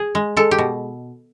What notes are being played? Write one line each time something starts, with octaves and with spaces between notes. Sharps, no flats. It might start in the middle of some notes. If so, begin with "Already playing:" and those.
Already playing: G#4
G#3
G#3 A4
G4
B2